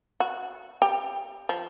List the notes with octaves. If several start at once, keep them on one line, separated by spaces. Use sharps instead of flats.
F#4
G4
F3